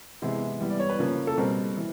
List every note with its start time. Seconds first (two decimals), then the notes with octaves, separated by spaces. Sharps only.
0.22 C3 E3 G#3 B3
0.60 E3 G3 B3
0.70 D5
0.80 C#5
0.90 B4
0.99 C#3 F3 A#3 C#4
1.27 A4
1.37 B2 G3 C4 A#4
1.77 E3